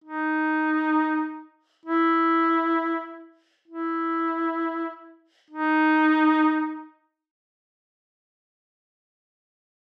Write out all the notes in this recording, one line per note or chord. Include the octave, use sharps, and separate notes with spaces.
D#4
E4
E4
D#4